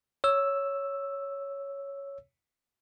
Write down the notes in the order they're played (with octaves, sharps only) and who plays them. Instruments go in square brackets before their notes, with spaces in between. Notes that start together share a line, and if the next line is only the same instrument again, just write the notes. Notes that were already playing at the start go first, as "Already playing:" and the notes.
[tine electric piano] C#5 E6